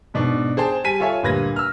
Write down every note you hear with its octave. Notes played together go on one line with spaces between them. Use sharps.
G#2 B2 D4
G#4 C5 G5 A5
G3 G#5 A5 B6 D#7
F4 A4 C#5 E5 G#5
D2 A#2 G3 B4 G#6 A#6
E6 F6